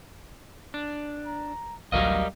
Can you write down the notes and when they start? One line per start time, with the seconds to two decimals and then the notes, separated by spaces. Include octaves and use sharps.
0.74 D4
1.26 A#5
1.92 A1 D2 F#3 G3 A#4 D#5 F5